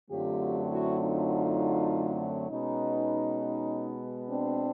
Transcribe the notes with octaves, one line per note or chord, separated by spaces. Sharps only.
F#2 D3 F#3 A3 C4 F4 G4
E4 F#4
D#4 F4
B2 G#3 B3 C#4 D#4
C4 D4